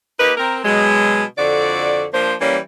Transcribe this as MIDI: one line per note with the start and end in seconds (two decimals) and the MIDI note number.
0.19 0.31 58
0.19 0.31 63
0.19 0.31 67
0.19 0.31 70
0.19 0.31 71
0.37 0.60 60
0.37 0.60 70
0.64 1.22 47
0.64 1.22 54
0.64 1.22 56
1.37 2.04 41
1.37 2.04 50
1.37 2.04 66
1.37 2.04 74
2.13 2.33 53
2.13 2.33 58
2.13 2.33 62
2.13 2.33 72
2.40 2.56 52
2.40 2.56 55
2.40 2.56 58
2.40 2.56 61